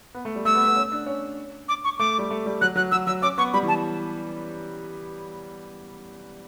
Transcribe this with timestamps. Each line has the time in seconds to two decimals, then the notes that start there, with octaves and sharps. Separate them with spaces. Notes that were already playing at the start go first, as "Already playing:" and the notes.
0.14 B3
0.25 A3
0.36 G3
0.45 A3 E6
0.55 B3
0.66 B3
0.76 C#4
0.92 D4
1.06 C#4
1.69 D6
1.84 C#6
1.99 A3 D6
2.19 G3
2.31 A3
2.46 G3
2.61 F#3 F#6
2.76 F#3 F#6
2.91 F#3 E6
3.07 F#3 E6
3.22 C#4 D6
3.38 B3 C#6
3.53 G3 B5
3.63 E3
3.68 A5